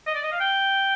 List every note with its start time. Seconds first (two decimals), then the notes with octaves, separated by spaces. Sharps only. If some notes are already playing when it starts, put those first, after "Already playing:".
0.07 D#5
0.15 D5
0.23 D#5
0.32 F5
0.40 G5